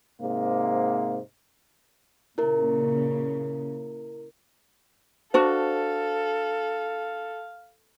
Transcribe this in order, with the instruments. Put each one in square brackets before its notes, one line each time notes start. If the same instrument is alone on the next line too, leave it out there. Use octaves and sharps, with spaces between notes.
[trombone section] G#2 C3 A#3
[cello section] A#2 C#3 [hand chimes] E4 A#4
[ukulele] D4 F#4 [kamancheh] A4 [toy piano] C5 [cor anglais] F5